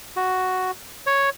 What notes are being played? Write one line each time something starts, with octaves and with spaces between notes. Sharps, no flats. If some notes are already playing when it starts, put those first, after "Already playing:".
F#4
C#5